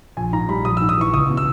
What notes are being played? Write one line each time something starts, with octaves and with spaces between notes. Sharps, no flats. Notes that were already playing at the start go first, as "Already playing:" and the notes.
A#1 G#5
G#2 A#5
G3 B5
A#1 D#6
E6
G#2
D#6
E3 C#6
C#2 D#6
B2
E6